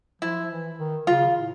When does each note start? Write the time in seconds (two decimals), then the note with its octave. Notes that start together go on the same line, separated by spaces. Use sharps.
0.22 F3 E4
0.50 E3
0.79 D#3
1.07 C#3 F4
1.36 A2